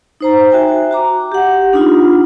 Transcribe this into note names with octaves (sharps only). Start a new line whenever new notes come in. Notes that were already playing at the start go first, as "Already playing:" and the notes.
D#4 C5 A#5
F#4 E5 G5 G#5
F#4 A#5 D6
G4 F#5
D4 D#4 F4